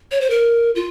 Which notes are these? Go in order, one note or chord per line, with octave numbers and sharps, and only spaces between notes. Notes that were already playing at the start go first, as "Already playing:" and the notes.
C#5
C5
A#4
F4